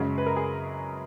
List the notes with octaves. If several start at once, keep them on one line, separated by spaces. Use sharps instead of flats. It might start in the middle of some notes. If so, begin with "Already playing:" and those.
Already playing: F#2 C#3 G#3 F#4
B4
A#4
G#4